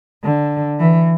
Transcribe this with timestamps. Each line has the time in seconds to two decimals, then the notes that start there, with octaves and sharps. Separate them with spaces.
0.24 D3
0.79 E3